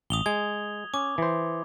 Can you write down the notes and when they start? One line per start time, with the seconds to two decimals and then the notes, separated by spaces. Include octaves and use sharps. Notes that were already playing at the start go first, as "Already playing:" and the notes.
0.10 A1 D#6 F7 G7
0.26 G#3 G#6
0.94 C#4 D6
1.18 E3 C5